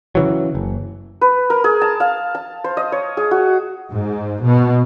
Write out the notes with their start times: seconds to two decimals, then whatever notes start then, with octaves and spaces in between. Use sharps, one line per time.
0.15 C#3 E3 F#3
0.55 F#1
1.21 B4
1.50 A#4
1.64 G#4
1.81 A5
2.00 F5
2.35 A5
2.64 C5
2.77 D#5
2.92 C#5
3.17 G#4
3.31 F#4
3.92 G#2
4.45 B2